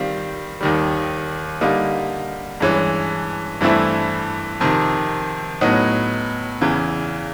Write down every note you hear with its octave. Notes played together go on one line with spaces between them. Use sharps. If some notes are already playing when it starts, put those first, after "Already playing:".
Already playing: D#3 G3 C4 F4
D#2 D#3 G3
D3 G3 A#3 D#4
G2 E3 G#3 C#4
G2 E3 A3 C4 E4
F2 C3 D#3
A2 F#3 B3 D#4
E2 C#3 E3